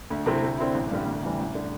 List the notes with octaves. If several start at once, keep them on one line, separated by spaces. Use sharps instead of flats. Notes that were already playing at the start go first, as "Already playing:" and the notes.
D2
C3 A3 C4 E4
D2
D3 C4 E4
A1
G2 D3 G3
D2
C3 E3 G3
A1
D3